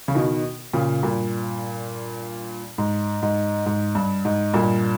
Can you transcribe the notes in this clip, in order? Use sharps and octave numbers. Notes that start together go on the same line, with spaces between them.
C#3
B2 D#3
A#2 C#3
G2 A#2
G#2
G#2
G#2
G2
G#2
G2 A#2